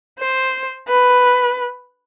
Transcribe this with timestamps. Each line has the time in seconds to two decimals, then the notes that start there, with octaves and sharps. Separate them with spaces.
0.19 C5
0.88 B4